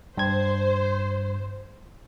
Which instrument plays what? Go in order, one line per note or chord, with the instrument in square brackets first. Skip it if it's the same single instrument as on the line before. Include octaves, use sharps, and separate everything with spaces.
[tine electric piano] G2 G#6 [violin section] C5